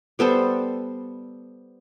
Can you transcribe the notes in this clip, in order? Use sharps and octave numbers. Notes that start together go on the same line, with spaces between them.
G3 B3 A4 C5